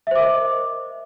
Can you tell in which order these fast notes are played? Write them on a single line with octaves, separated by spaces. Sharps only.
E5 C5 D6 A#4 D#5